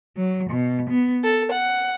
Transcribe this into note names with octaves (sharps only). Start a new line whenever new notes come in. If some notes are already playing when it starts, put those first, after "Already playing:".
F#3
B2
B3
A4
F#5